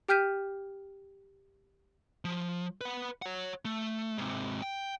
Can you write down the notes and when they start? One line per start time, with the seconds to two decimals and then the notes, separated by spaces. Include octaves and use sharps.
0.08 G4 G5 F6 G6 B6 D#7
2.25 F3
2.81 B4 F#5
3.22 C#5 F#5
3.65 A3
4.18 G#2 C3
4.62 G5